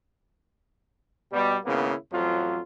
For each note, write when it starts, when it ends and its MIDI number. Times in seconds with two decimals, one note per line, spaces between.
1.33 1.56 47
1.33 1.56 55
1.65 1.94 32
1.65 1.94 49
1.65 1.94 58
1.65 1.94 59
1.65 1.94 64
2.12 2.59 33
2.12 2.59 41
2.12 2.59 53
2.12 2.59 54
2.12 2.59 65